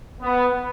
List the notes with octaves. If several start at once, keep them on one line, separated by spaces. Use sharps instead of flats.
B3